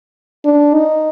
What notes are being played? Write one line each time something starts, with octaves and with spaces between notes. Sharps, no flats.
D4
D#4